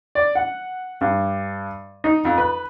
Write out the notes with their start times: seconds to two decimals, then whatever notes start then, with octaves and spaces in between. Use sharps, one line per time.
0.15 D5
0.35 F#5
1.01 G2
2.04 D#4
2.25 F2
2.38 B4